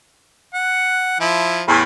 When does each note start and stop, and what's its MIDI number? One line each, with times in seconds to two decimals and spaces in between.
0.54 1.16 78
1.20 1.63 53
1.20 1.63 64
1.67 1.83 40
1.67 1.83 45